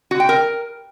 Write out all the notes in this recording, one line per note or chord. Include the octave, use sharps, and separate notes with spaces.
F#4
G5
A#4